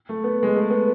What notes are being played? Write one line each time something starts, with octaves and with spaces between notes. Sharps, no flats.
A3
B3
G#3
A3
B3